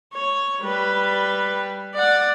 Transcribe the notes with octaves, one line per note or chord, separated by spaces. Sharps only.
C#5
G3 B4
D5 F#5